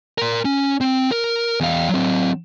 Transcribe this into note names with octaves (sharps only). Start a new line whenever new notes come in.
A#4 C6
C#4
C4
A#4
E2 F5
F#3 C4